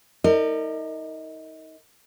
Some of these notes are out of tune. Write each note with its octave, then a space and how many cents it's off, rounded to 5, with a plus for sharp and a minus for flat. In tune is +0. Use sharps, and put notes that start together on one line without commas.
D#4 +30 A#4 -30 D5 +40